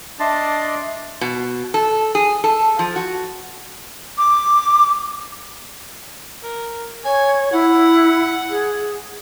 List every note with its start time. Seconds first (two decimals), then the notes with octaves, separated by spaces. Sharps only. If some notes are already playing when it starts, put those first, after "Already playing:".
0.20 D4 D#5 E5 A5 C6
1.21 B2
1.74 A4
2.15 G#4
2.44 A4
2.79 F3
2.96 F#4
4.18 D6
6.43 A#4
7.05 C#5 G#5
7.53 E4 F#5
8.50 G#4